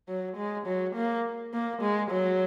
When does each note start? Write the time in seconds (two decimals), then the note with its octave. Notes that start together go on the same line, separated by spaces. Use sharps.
0.08 F#3
0.37 G#3
0.67 F#3
0.96 A#3
1.54 A#3
1.82 G#3
2.11 F#3